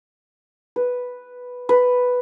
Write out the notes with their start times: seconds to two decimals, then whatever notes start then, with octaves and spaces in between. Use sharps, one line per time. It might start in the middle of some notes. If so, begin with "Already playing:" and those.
0.76 B4
1.69 B4